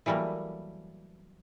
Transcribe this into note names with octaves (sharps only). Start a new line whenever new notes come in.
E3 F#3 G3 A3 A#3